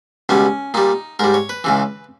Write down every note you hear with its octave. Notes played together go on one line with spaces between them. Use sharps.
C#2 B2 G3 C#4
A#2 G3 D#4
G#2 G3 A#4
C#5
B4
C#2 C#3 E3